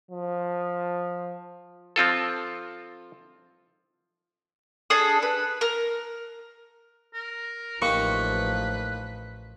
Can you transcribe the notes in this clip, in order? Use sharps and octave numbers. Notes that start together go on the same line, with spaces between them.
F3
F3 C4 F4 A4
D4 G#4 A4 D#6
B4
A#4
A#4
A1 F3 A#3 D#4 G4 B4 C#6